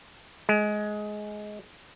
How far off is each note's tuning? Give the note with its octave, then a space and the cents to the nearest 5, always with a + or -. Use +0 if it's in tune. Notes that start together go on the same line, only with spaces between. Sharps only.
G#3 +15